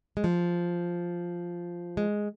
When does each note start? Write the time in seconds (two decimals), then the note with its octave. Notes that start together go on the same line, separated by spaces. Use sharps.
0.17 G#3
0.24 F3
1.97 G#3